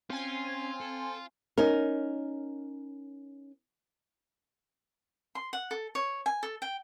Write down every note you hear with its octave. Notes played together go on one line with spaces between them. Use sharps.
C4 C#4 F4 G#5 C6
A4
C#4 D#4 A#4
C6
F#5
A4
C#5
G#5
A4
G5